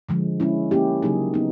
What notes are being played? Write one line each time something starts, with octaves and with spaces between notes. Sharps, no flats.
D3 F3 G#3
G#3 C#4 E4
A#3 C#4 E4 G4
C#3 F#3 A#3 D#4 G#4
B3 D#4